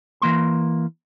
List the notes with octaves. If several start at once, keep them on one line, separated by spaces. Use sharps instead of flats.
E3 A#3 C6